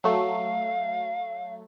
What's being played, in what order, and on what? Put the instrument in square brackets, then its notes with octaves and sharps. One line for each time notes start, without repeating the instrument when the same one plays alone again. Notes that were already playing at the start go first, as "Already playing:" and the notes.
[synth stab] F#3 A3 [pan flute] F5